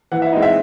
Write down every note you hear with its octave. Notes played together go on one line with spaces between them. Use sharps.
E3 F#5
E5
G#3 C4 D#4 D#5
E5